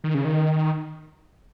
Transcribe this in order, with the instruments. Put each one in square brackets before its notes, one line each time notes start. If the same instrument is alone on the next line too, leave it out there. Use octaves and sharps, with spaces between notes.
[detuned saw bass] D#3
C#3
D#3